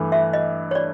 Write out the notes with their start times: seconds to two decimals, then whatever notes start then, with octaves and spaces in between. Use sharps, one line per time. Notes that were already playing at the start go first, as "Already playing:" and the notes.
Already playing: G2 E3 A3
0.12 E5
0.33 D#5
0.71 C#5
0.75 D5